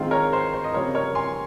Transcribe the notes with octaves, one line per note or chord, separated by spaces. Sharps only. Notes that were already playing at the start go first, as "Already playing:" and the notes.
Already playing: D#3 G#3 C4 F4
A#4 C#5
C5
C5
D#5
C#3 G3 C4 F4 A#4 C#5
A#4 C#5
G#5 C6